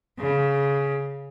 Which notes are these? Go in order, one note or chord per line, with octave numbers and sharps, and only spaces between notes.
C#3